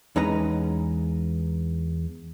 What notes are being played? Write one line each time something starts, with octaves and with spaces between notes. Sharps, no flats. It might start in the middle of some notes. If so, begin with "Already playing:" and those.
E2 G#3 C#4 D#4 B4 A#5